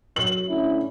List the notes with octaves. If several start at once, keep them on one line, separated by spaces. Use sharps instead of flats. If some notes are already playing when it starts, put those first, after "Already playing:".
F#3 F#7
D3 A3 C#4 E4